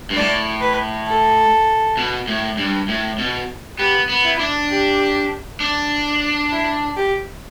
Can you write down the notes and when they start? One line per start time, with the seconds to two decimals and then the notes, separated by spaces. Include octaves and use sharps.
0.10 G2
0.16 A2 D5
0.61 B4
1.07 A4
1.97 B2
2.28 A2
2.58 G2
2.88 A2
3.18 B2
3.79 B3 G4
4.09 B3
4.25 E4
4.39 D4
4.70 G4
5.60 D4
6.52 E4
6.97 G4